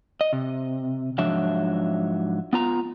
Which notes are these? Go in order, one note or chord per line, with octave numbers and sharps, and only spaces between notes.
D#5
C3
G#2 F3 F#3 D4 E5
B3 F4 A#5